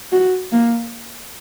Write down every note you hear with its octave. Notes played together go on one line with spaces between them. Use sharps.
F#4
A#3